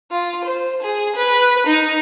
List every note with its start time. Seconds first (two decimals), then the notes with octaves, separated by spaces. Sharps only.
0.11 F4
0.44 C5
0.82 G#4
1.16 B4
1.67 D#4